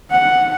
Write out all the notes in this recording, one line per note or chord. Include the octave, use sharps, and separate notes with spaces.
F#5